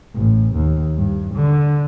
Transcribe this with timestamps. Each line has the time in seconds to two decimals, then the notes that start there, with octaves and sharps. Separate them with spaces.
0.15 A1
0.55 D#2
0.97 G2
1.35 D3